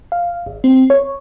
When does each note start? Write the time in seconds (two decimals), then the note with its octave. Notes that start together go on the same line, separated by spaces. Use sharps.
0.12 F5
0.46 G#1
0.64 C4
0.90 C#5